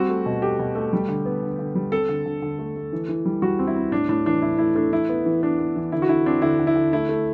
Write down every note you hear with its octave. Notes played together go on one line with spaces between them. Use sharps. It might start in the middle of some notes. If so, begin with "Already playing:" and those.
Already playing: G3 C4 F#4
A3
B2
A3 G4
B2
A3
G3
D3
B3
D3
D3
G3
C4 A4
D3
D3
D3
A3
A3
E3
E3
G3
G3 F#4
C4
E4
C4
A2 D4
A2 D4
E3 D4
A2 E4
A3 E4
A3 D4
E3 E4
B3
E3
B3 D4
B3
E3
D3 E4
F#4
D3 E4
C4 D4
D3 E4
D3
E4
D3
A3 E4
A3